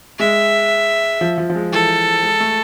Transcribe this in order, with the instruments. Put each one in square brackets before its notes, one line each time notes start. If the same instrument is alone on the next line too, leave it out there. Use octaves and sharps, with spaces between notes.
[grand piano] G#3 [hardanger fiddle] E5
[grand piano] F3
F3
F3
G#3
[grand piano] E3 [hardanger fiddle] A4
[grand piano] G#3
A3